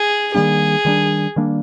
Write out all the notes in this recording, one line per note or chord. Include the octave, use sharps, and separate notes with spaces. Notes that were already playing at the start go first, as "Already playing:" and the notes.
Already playing: G#4
D#3 G3 A#3 D4 G#4
D#3 G3 A#3 D4
D#3 G3 A#3 D4